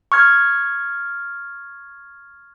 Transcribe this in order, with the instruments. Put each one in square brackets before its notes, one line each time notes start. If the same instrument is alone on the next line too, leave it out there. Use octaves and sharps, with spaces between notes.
[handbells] C#6 F6 G#6